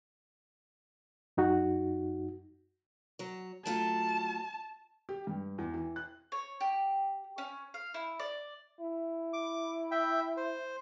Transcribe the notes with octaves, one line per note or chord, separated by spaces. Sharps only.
F#2 D#4 F#4
F#3 C#5
F#3 A3 F4 A5
G4
G2
E2
E3
F#6
C#5
G4
C#4
F5
E4
D5
E4
D6
E5 G5
C5